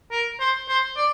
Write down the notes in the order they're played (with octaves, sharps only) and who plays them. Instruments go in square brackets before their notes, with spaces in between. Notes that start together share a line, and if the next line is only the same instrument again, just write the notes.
[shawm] A#4
C5
C5
D5